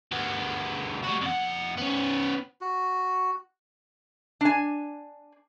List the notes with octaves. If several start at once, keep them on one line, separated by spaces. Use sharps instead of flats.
D2 B3
G3 F#4
F2 F#5
B3 C#4
F#4
D4 G#5